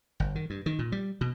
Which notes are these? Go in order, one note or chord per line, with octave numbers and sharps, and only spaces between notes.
G1
D#3
G2
D#3
A#2
G3
B2